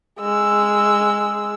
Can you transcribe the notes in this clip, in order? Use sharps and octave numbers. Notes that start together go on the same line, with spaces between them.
G#3 E6